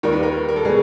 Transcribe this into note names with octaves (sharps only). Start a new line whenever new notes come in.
D#2 D#3 G3 A#4
B4
A#4
A#4
A4
B2 G3 G#4